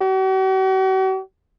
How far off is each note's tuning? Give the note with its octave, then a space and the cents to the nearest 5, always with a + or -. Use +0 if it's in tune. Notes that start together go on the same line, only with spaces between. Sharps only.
F#4 +45